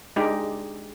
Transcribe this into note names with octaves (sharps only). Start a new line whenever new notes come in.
G#3 D4 D#4 G4